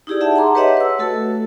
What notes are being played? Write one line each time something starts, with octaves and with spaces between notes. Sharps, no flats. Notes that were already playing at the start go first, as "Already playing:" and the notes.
D#4 E4 G4 G#4 D5
G#4 E5 F#5 A5
F#5 A#5 C6 D6
G4 B4 C#5 D#5 E5 F#5
B4 E6
A3 F#4 A4